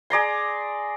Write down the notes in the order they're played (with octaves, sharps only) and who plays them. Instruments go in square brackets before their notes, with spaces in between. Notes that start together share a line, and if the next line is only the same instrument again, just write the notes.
[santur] G#4 D5 A#5 C6